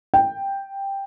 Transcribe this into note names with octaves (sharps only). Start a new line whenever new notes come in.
G5